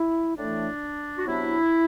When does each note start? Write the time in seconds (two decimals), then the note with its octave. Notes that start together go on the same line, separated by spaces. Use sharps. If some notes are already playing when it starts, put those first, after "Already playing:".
Already playing: E4
0.37 A2 E3 A3 D4
1.18 F#4
1.26 C3 F#3 B3 D4 E4